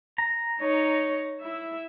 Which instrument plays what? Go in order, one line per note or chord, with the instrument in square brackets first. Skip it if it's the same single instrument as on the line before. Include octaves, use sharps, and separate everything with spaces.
[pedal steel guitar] A#5
[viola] D#4 C#5
E4 E5